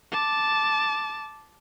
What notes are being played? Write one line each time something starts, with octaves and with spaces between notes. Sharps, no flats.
A5 D6